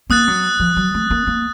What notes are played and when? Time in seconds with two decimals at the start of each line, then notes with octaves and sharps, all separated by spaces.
0.10 A#3 D#6 F#6 A6
0.27 F#3
0.60 F3
0.76 F#3
0.94 A3
1.10 A#3
1.27 A#3